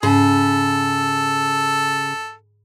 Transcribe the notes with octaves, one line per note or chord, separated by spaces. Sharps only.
G#2 C#3 A4